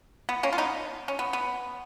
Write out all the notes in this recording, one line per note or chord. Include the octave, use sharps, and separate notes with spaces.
B3
A#3 C#4
F4
B3 D#4
C#4
B3
B3